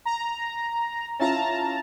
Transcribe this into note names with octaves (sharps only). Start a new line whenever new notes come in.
A#5
C#4 E4 F4 A5 A#5